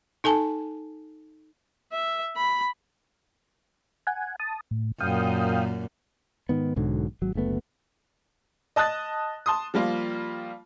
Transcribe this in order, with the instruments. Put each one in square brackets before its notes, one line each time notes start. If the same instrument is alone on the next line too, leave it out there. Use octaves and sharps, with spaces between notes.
[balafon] D#4 A4 G#5 A5
[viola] E5
B5
[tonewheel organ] F#5 G#5
A5 D#6
A2
[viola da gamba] F#2 A#2 [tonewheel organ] F5 G5 D#6
[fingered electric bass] G#2 D#3 B3
B1 G#2 D3 F#3
G#1 F#3
F#1 D2 A3 B3
[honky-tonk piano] D#5 A5 D#6 F#6 A6
A5 C6 D#6
F3 G3 A#3 F4